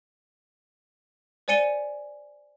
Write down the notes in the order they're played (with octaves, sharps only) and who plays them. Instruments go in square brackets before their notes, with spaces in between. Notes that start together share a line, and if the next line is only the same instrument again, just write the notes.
[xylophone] C5 D5 G#5 C#7 D#7 G7